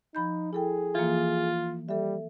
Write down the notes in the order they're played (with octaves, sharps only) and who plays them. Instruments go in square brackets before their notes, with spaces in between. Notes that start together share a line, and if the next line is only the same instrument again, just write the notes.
[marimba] F3 B5 G6 [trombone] D#4
[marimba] E4 A4 G5 [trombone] G#4
[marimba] E3 F3 A#3 [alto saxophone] F4
[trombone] G3 [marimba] A4 E5